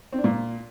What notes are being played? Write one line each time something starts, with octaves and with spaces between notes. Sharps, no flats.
C4
D4
A#2